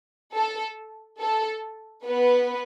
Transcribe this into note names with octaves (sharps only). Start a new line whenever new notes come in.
A4
A4
B3 B4